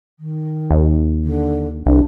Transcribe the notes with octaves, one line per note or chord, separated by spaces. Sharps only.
D#3
D#2
D3
C2 D4